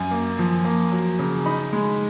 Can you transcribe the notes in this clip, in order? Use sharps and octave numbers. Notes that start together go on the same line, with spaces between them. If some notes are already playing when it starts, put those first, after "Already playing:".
Already playing: F#2 G#5
A#3
F3
A#3
F#3
C#3
D#4 B5
G#3